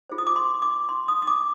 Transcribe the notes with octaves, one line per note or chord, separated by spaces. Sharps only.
F4 G#4 C5
D#6
D6
C6
D6
C6
D#6
D#6
D6